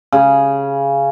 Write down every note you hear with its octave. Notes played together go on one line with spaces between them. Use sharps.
C#3